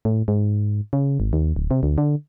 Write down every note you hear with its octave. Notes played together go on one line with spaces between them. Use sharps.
A2
G#2
C#3
G#1
D#2
D1
C3
D2
D3